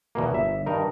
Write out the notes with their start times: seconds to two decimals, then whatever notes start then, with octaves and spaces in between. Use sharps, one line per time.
0.15 E2 B2 A#3
0.31 G1 E5
0.66 G2 D#3 D#4 A#4